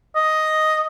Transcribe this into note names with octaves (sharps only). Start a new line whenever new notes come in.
D#5